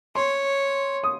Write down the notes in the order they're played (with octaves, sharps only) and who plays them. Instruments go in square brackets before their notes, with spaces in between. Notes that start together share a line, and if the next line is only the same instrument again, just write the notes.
[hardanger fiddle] C#5 [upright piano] C6
[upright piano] D#6